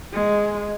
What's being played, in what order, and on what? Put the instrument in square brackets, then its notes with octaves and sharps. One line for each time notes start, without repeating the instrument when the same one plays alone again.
[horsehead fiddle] G#3